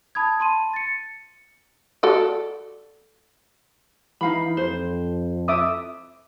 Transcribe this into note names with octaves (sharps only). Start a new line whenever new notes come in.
A5 B5 D#6 G#6
A5 C6 D#7
A6 C#7
F#4 A4 D5
E3 D#4 F5 B5
F2 C5
E5 D6 D#6